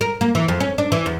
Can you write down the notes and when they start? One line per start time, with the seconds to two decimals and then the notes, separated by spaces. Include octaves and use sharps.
0.01 A#4
0.21 A#3
0.35 E3
0.48 F2
0.60 C#4
0.78 D4
0.92 E3
1.06 E2